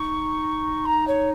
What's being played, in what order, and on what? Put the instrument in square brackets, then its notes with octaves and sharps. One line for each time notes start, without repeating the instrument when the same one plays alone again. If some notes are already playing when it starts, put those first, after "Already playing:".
Already playing: [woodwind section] D#4 [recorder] C#6
[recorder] A#5
C#5